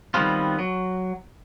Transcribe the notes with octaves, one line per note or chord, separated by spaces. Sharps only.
D#3 G3 B3 C4 F4
F#3